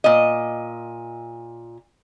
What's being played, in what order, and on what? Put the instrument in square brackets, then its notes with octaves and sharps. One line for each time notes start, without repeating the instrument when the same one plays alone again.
[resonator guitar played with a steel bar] A#2 D#5